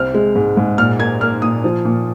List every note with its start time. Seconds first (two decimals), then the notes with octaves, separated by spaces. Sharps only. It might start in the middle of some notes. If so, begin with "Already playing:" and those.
Already playing: C2 C4 F6
0.14 G#3
0.36 G#2
0.57 G#2
0.78 A#2 F6
0.99 A#3 G#6
1.21 A#3 F6
1.42 A#2 D#6
1.64 F3
1.85 A#2